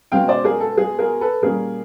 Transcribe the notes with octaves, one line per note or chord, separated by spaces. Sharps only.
B2 G#3 C#4 F5 G5
C5 D5
G#4 A#4
A4
G#4
G#4 A#4
A4 B4
A#2 G3 A#3 C#4 G#4 A#4